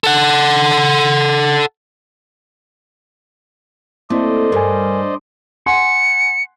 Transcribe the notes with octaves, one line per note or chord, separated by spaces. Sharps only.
A4 F#5
A3 A#3 C4 E4 C5 D5 D#5
G2 A#4 G#5
F#5 G#5 C6 C#7